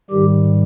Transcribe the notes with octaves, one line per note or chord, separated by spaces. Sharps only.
G#2 D#3 G3 G4